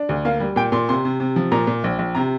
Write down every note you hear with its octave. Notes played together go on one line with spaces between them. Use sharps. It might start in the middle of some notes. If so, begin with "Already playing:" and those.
Already playing: D4
D2
A#3 F5
G3
A#2 G5
A#2 C6
C3 C6
C3
C3
F3
A#2 A#5
A#2
A#1
A#1
C3 A#5